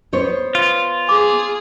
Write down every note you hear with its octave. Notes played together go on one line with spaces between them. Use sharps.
B3 C5 C#5
F4
G#4 D6